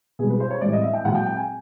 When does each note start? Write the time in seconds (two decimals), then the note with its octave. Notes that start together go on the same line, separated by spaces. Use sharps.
0.19 B2 G3 G#4
0.30 B4
0.40 C5
0.51 C#5
0.61 A2 E3 G3 D5
0.73 D#5
0.83 E5
0.93 G5
1.05 A#2 F#3 F#5
1.15 G5
1.26 G5
1.37 G#5